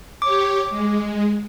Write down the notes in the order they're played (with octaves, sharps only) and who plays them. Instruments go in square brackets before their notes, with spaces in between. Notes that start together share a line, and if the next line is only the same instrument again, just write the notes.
[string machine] G4 C#5 [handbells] D6
[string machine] G#3